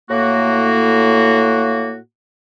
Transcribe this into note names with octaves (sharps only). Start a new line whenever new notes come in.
A2 A#3 F#4